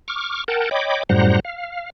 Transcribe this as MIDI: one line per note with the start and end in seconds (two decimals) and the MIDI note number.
0.08 0.44 85
0.08 0.44 86
0.08 0.44 89
0.48 0.69 70
0.48 0.69 78
0.48 0.69 79
0.48 0.69 81
0.71 1.03 73
0.71 1.03 75
0.71 1.03 79
0.71 1.03 83
0.71 1.03 86
1.09 1.40 42
1.09 1.40 45
1.09 1.40 55
1.09 1.40 72
1.09 1.40 78
1.09 1.40 82
1.45 1.90 77